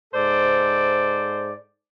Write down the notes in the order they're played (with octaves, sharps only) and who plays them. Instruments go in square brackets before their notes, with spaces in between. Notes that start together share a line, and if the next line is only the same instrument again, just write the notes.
[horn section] G#2 A4 C5 D5